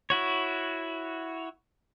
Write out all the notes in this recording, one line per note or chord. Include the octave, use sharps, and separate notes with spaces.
E4 F#4 C#5